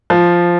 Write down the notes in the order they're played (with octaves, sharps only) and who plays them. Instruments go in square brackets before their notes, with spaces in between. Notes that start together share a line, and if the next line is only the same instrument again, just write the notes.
[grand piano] F3